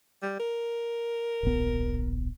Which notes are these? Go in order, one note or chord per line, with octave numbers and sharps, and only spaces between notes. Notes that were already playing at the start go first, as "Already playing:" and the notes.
G3
A#4
D1 A#1 B3